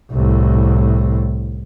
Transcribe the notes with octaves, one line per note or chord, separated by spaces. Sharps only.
C2 A2